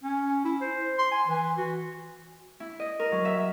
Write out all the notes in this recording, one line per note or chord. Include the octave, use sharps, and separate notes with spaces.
C#4
E4
C5
C6
G#5
E3
F#4
E4
D#5
A#4
F#3
E5
E5